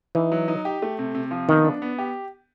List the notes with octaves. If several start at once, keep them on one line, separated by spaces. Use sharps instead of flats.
E3 D#4
F#3
D#4
G4
A3
C3
C3
F3
D#3 B3
D4
B3
G4